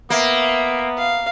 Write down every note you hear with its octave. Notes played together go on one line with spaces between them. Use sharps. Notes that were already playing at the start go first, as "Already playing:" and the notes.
A#3 B3 E5
F5